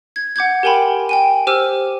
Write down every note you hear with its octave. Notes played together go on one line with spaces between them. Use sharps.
G#6
F#5 D6 G6 G#6
G4 A#4 G5 G#5 B5 C6
G5 G#5 D#7
G4 C5 D6 E6 F6 D#7